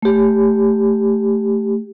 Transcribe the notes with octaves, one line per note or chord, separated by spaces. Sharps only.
A3 G4